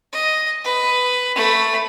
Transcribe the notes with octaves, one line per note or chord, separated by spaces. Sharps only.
D#5
B4
A3 B5